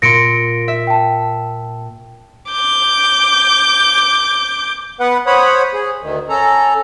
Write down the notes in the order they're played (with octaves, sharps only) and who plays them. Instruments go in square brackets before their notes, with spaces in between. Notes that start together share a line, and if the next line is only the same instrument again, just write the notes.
[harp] A#2 C6 [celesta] A#6 C#7 D7
[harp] E5
[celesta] G5 A5
[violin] D6 G6
[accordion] B3 B4 F#5
C5 C#5 F#5 B5 D#6
G#4
D2 D#3
C#4 A4 A#5